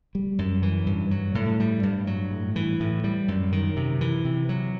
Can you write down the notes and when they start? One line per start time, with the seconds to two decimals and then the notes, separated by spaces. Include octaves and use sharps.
0.15 G3
0.39 F#2
0.62 E3
0.87 G2
1.11 F#3
1.35 A2
1.60 G3
1.83 G2
2.07 F#3
2.31 A2
2.56 E3
2.80 A2
3.04 G3
3.28 F#2
3.52 D#3
3.76 C3
4.01 E3
4.25 C3
4.49 F#3